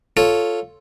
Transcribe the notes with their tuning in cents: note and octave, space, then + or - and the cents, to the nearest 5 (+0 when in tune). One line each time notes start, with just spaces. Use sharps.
F4 +0 A4 +0 C#5 +0